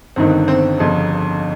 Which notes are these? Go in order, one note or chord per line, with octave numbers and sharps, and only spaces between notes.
G1 G2 D#3 C4
C4
G1 F2 C#3